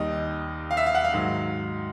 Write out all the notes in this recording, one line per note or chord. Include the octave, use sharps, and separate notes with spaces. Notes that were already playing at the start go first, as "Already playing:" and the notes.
Already playing: D#2 D#3 G3 D#5
F5
E5
F5
F#5
F5
G#2 D#3 F#3